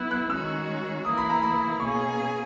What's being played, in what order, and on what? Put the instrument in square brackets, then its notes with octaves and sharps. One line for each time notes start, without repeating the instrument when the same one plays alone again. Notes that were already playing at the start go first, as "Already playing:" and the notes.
Already playing: [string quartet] F#3 B3 E4 [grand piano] F#6
[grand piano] F#6
[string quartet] D#3 G#3 C#4 F#4 C#5 [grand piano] E6
[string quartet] E3 A#3 E4 A#4 [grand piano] D#6
[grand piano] B5
A#5
B5
[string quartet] B2 A#3 C#4 G#4 [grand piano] C#6